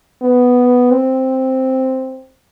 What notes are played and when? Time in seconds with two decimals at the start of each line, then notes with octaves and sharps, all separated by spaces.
0.22 B3
0.91 C4